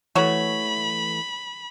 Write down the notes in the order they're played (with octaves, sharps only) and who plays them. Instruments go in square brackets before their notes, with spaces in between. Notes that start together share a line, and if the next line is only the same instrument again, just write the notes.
[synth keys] E3 A3 [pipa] F#4 C#5 [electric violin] B5